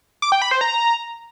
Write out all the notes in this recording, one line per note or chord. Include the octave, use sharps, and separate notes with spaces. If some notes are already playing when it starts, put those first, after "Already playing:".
D6
G5
B5
C5
A#5